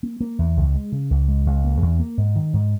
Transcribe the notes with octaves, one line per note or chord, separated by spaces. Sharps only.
A#3
A#3
E2
C#2
G#3
C#3
C#2
G#3
C#2
A#3
E2
A#3
G#2
D#3
G#2